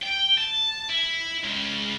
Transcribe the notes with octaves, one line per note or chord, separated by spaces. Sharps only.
G5
A5
E4
C#2 C#3